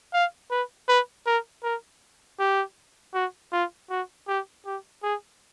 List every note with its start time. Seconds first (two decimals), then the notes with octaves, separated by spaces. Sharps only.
0.13 F5
0.51 B4
0.88 B4
1.26 A#4
1.64 A#4
2.39 G4
3.14 F#4
3.52 F4
3.90 F#4
4.28 G4
4.66 G4
5.03 G#4